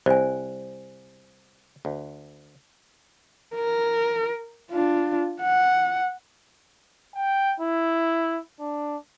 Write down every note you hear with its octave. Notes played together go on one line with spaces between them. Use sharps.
C2 C5 G#5
D2
A#4
D4 F4
F#5
G5
E4
D4